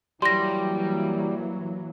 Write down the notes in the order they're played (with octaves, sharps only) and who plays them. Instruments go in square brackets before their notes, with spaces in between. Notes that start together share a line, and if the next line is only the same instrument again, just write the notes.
[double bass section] E3 F#3 A#3 [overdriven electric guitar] G3 [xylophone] C6 A#6